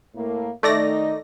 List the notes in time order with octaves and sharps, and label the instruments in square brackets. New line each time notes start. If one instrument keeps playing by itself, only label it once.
[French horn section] A2 A#3
[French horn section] D#3 D#4 [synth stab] A3 D5 A#6